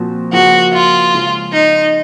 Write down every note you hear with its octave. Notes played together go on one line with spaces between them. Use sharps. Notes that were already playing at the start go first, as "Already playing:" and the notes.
Already playing: A#2 F3 C4 F#4 A#4
C#3 F3 A#3 F4 F#4
F4
C#3 F3 G#3
D#4